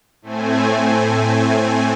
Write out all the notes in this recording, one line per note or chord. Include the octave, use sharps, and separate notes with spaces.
A2 A3 C4 G#5